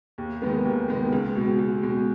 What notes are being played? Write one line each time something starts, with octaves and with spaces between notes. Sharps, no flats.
D#2
D#3 G#3 B3
D#2
D#3 G#3 B3
C#2
B2 G#3
C#2
B2 G#3